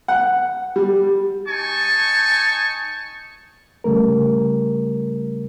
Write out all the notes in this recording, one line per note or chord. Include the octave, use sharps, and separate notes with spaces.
F#5
G3
D#4 G#5 A5 C#6
C#3 G3 A3 A#4